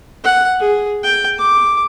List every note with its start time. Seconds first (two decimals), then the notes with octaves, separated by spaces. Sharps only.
0.24 F#5
0.60 G#4
1.04 G5
1.39 D6